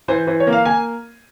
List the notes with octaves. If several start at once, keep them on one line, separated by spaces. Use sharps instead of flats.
E3 C5
E3 C5
C#5
A#3
F5
A#3 G#5